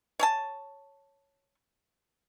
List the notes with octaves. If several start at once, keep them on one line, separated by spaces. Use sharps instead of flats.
C#5 G#5 A5